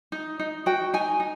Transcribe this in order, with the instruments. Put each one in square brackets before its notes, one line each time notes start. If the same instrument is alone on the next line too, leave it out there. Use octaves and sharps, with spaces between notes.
[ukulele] D#4
D#4
F#4 G5
D#4 G#5
D#4